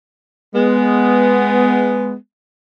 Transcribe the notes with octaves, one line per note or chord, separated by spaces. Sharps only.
G#3 B3